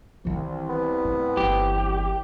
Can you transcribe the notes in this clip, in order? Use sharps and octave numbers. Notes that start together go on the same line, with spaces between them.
C2 D#3 E3
B3
A2
G1 E3 G4